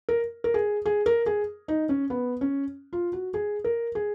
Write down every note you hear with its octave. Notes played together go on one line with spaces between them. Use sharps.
A#4
A#4
G#4
G#4
A#4
G#4
D#4
C#4
B3
C#4
F4
F#4
G#4
A#4
G#4